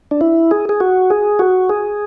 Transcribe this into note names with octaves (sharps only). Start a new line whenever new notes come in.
D4
E4
G#4
G#4
F#4
G#4
F#4
G#4